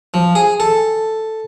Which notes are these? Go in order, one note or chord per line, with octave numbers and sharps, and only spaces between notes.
F3
G#4
A4